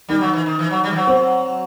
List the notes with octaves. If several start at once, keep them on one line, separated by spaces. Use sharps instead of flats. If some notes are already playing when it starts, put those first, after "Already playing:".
D#3 G3
F#3
E3
D#3
E3
F#3
G3
E3
F#3
C4